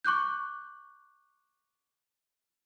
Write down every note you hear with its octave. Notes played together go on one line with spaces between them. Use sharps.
C#6 D6 F#6 G6